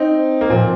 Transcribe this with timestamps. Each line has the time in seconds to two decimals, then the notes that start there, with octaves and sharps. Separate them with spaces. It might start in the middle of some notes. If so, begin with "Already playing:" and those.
Already playing: C4 D#4
0.41 A#3
0.50 A#2 F3 C4